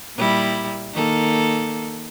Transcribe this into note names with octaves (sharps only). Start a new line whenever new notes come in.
A#2 G3 E4
D#3 A#3 A4